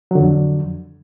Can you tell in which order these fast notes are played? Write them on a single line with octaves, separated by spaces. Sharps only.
F#3 D3 F2